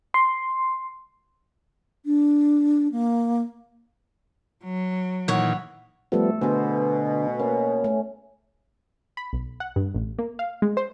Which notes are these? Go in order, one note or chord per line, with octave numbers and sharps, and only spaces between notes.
C6
D4
A#3
F#3
A#2 D#3 E3 C#5 F#5
F3 G3 A3 B3 A4
B2 D3 B3 G#4 C5
A#3 C#4
A3
B5
B1
F#5
G2
A1
A#3
F5
G#3
C5